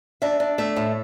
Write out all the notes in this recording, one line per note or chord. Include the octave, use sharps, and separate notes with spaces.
D4 E5
D4
A3 E5
A2